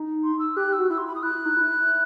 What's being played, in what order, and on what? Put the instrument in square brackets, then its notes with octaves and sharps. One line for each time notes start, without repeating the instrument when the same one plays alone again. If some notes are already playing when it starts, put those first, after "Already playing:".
Already playing: [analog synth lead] D#4
[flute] C6
E6
[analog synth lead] G4 [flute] F#6
[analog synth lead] G4
[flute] E6
[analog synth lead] F#4
[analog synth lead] E4 [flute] E6
[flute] C6
B5
D#6
[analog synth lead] E4 [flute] F#6
[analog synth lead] E4
D#4
E4